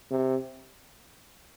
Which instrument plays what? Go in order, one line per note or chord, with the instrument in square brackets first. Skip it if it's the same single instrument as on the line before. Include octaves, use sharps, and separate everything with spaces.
[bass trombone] C3